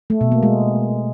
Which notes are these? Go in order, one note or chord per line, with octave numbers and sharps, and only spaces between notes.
A3
B2
A#3
G#3